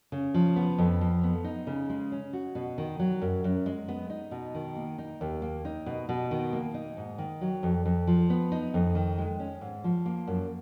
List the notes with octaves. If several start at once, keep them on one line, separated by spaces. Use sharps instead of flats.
C#3
F3
B3
F2
F3
B3
D#4
C#3
G#3
C#4
F#4
B2
D#3
F#3
F#2
F#2
G#3
B3
D#4
B2
D#3
A#3
D#4
D#2
A#3
D#4
B2
B2
D#3
A#3
D#4
G#2
D#3
F#3
F2
F2
F3
B3
D#4
F2
D#3
G#3
C#4
G#2
F3
A#3
F#2